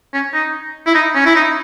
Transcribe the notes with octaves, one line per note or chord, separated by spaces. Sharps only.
C#4
D#4
E4
D#4
C#4
E4
D#4